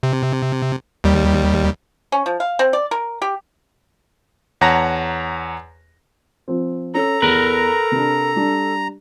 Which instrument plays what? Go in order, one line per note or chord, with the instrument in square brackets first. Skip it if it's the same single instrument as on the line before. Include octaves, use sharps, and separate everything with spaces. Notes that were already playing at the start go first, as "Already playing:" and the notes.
[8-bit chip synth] C3
D#2 G3
[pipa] C#4
F3
F5
C4
D5
A#4
G4
[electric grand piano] E2 C#5 F#5 A5 A#5 A#6
[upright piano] F3 C4
[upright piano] C#4 [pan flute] A4 [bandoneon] A#5
[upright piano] E2 [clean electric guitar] A#4 B4
[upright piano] C3 D4
G3 D4